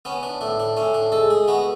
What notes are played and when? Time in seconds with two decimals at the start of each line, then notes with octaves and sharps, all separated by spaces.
0.05 B3 C#4
0.23 D4
0.41 A2 D4
0.60 D4
0.77 A2 C#4
0.94 D4
1.12 G#3 A4
1.30 G#4
1.48 B3 F#4